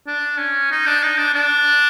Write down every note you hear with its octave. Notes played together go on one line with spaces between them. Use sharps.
D4
C#4
D#4
D4
D#4
D4
D4